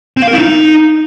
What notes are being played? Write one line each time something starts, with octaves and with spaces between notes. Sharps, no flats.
C4
F5
A#4
E4
D#4